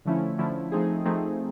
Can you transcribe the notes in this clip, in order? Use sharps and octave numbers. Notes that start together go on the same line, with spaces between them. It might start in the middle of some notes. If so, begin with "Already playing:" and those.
D3 F3 A3 C#4 E4
D3 F3 A3 C#4 E4
F3 A3 C4 D#4 G#4
F3 A3 C4 D#4 G#4